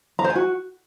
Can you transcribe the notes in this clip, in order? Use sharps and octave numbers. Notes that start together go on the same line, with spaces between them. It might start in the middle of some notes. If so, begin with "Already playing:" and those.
A#5
C5
G#5
F#4